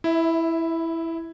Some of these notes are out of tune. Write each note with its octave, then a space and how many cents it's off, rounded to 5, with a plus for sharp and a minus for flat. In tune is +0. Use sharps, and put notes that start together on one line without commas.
E4 +0 E5 -30